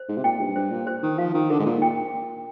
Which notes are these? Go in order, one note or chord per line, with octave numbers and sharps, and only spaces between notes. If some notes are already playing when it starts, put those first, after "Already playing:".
Already playing: C5
G#2
C3
A#2 G5
G2
G2 C5
A#2
C5
D#3
F3 F5
D#3
D3 A#4
G#2
A#2
G5